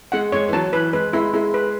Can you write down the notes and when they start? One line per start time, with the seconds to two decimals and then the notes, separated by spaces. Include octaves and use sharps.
0.12 G#3 F#5
0.32 G#3 C#5
0.48 E3
0.53 F#3 A5
0.73 E3 B4
0.93 G#3 B4
1.13 G#3 E4
1.33 G#3 E4
1.54 B4